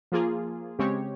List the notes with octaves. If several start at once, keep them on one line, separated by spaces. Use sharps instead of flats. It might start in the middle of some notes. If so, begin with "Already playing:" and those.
F3 A#3 F4 G#4
C#3 G#3 C4 G4 C#5